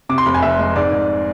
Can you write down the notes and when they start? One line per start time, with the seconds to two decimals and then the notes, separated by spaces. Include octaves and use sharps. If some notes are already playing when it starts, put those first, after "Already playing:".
0.09 C3 D6
0.18 C6
0.26 F1 B5
0.34 G#5
0.42 F1 E5
0.59 G#3
0.76 G#2 D5
0.92 G#2